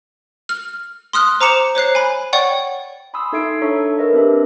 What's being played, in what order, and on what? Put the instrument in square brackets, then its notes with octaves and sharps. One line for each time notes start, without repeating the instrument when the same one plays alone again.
[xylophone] F6
C6 D#6 F6 F#6
C5 A#5 D6 C#7 E7 F7
C5 C#5 F#6 C7
G#5 B5
C#5 D5 F#5 G5 C#6
[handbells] G#5 B5 C6 D#6 E6
D#4 A4 E5 G#6 C7 D7
D4 A4 C#5 E5 A#5 C#6
A#4 B4 D#5 E5
C4 D4 G4 E5